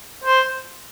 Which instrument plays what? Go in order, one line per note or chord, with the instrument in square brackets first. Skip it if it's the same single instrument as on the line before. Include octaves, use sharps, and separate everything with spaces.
[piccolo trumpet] C5